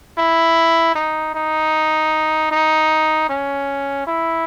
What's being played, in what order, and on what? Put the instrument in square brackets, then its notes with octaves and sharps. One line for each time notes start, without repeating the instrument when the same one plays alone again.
[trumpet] E4
D#4
D#4
D#4
C#4
E4